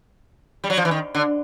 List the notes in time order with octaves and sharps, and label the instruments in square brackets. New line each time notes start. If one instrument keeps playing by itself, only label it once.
[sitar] G3
F#3
F3
E3
D#3
D3